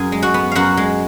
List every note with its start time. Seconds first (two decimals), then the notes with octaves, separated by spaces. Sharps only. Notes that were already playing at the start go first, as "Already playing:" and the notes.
Already playing: F#2 G#4 G#5
0.12 G#3
0.22 F#4 F#5
0.34 B3
0.52 F#2 F#4 F5 F#5
0.77 G#3